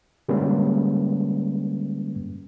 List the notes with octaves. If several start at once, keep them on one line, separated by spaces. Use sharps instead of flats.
D3 G3 G#3 A#3 C#4 B4